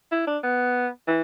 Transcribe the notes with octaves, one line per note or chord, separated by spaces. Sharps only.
E4
D4
B3
E3